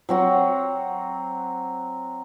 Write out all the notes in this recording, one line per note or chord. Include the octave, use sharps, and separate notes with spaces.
F#3 C4 F#4